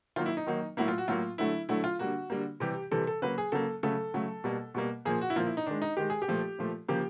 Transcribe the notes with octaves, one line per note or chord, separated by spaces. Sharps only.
D#3 F#3 A#3 F4
E4
D#4
D#3 F#3 A#3
A2 F#3 A#3 E4
F4
F#4
A2 F#3 A#3 F4
D3 F#3 A3 E4
D3 F#3 A3 E4
F4
D3 G3 A#3 F#4
D3 G3 A#3
C3 E3 G3 G4
C3 E3 G3 A4
A4
C#3 F#3 A#3 B4
G#4
C#3 F#3 A#3 A4
C#3 F#3 A3 A4
C#3 F#3 A3
B2 G3 A#3
B2 G3 A#3
A#2 F3 A#3 G#4
F#4
E4
A#2 F3 A#3 F4
E4
D#4
D#3 G#3 D4
D#4
D#3 G#3 G4
G#4
G4
A#2 F3 A3
A#2 F3 A3
C#3 F3 A#3 G4